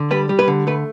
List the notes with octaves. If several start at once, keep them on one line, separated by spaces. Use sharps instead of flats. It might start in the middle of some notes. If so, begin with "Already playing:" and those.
Already playing: D3
G3 B4
G3
B4
D3
A3 B4